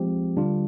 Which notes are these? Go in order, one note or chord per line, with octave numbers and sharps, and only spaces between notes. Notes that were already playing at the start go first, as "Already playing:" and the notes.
Already playing: F3 G#3 C4 G4
D3 G3 D4 F4